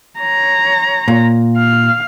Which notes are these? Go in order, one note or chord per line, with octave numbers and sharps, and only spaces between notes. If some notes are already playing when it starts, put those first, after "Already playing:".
C#5 A#5
A#2
F5